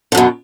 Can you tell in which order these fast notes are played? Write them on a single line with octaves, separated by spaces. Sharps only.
D3 F#2 B2